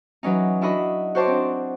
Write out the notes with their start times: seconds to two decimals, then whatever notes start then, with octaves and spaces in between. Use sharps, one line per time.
0.23 E3 F#3 C#4 D#4
0.61 D4 E4 F#4 D#5 B5
1.15 F#4 C5 C#5 A5 C6 D6
1.27 C4 D4